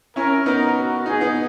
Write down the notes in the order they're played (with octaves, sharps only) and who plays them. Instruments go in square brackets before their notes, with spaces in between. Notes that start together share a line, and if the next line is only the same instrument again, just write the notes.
[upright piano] C#4 E4 [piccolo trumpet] A#4
[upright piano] B3 D#4 [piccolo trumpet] A#4
[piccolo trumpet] F#4
[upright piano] B3 D#4 [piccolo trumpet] G#4
[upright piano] B3 D#4